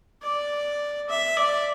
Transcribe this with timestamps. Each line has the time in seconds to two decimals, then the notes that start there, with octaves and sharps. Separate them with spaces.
0.22 D5
1.09 E5
1.37 D5